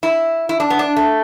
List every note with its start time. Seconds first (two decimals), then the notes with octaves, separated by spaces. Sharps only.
0.03 E4
0.49 E4
0.60 D4
0.70 B3
0.79 D4
0.96 A3